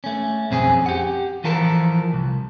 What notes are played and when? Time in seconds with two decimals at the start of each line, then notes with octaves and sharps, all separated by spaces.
0.04 A3 C#4
0.51 B1 F2 C4 C#4 G#4 G#5
0.86 G4 F#5
1.44 E3 F3 F4 A4 A#4
2.13 C2